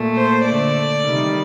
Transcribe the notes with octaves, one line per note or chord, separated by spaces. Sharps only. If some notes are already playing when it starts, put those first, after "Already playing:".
Already playing: A#2 A3
C5
D3 A3 D5
C3 D#3 G3